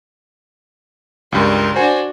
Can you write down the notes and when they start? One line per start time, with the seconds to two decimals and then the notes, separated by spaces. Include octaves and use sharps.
1.32 C#2 G2 A#4 C6
1.76 D4 F#4 C5 G#5